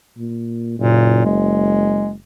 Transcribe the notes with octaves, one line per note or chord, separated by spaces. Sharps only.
A#2
F#1 A#2
G#3